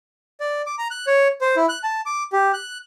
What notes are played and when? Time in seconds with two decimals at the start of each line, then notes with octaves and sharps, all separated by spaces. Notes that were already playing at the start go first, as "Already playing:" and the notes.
0.40 D5
0.66 D6
0.78 A#5
0.91 F#6
1.07 C#5
1.41 C5
1.56 E4
1.69 F#6
1.84 A5
2.06 D6
2.32 G4
2.53 F#6